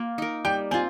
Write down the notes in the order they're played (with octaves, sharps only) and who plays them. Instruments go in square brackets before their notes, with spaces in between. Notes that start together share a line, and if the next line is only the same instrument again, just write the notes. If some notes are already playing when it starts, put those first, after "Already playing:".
Already playing: [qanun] A#3 F4
D#4 A#4
[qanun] G3 [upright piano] G5
[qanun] C4 F4 [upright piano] G#5